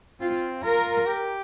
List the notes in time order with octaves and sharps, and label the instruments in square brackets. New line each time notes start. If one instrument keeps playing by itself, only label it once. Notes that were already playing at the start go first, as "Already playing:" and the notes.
[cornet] C4 [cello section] F4
[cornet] F4 [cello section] A#4
[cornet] G4